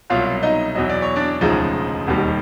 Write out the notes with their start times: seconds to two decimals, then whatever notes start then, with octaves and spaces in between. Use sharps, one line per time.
0.10 C2 B2 F#3 F4 F5
0.43 D#4 D#5
0.75 E2 B2 F#3 D#5
0.90 D5
1.02 C#5
1.16 D4 D5
1.41 E1 D2 C#3 F3 G#3 D#4 D#5
2.07 E1 D#2 D#3 G3